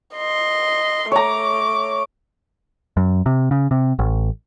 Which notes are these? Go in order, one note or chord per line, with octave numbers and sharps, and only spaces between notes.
D#5 C6
A3 C#5 A#5 D6
F#2
C3
C#3
C3
A1